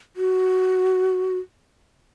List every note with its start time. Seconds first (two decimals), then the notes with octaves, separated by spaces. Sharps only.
0.16 F#4